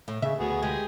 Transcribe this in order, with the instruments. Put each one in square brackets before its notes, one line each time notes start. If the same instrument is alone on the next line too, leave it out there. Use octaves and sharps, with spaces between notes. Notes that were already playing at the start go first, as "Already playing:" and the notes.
[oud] A2
[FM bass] C#3 [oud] E5
[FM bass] D2 [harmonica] B3 F#4 G#4
[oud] G#3 [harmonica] G4 G#5 D#6